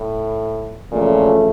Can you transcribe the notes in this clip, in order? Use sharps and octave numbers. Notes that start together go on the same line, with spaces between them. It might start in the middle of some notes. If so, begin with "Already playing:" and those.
Already playing: A2
F2 A#2 C#3 E3 A3 C#4